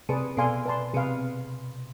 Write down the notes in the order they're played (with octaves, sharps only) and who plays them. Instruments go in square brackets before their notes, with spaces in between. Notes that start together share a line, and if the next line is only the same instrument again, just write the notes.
[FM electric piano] C3 [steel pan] G#4 B4 D5 A5
[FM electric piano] B2 [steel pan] A4 D5 F5 G#5 C6
[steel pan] B4 D5 A5 C6
[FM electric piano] C3 [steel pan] G#4 B4 F5